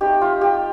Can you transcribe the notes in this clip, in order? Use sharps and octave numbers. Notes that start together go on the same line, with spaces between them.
A3 C4 D#4 G4
F4
G4